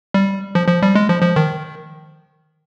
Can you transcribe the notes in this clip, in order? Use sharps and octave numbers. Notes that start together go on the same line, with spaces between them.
G3
F3
F3
G3
G#3
F3
F3
D#3